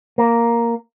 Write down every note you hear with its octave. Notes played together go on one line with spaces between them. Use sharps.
A#3